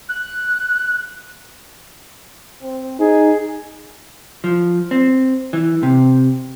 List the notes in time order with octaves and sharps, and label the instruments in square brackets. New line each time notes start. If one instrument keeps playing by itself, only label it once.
[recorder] F#6
[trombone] C4
[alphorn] D#4 [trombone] G#4
[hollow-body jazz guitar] F3
C4
E3
C3